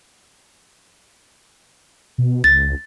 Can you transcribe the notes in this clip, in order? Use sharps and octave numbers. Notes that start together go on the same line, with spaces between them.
B2
C#2 A6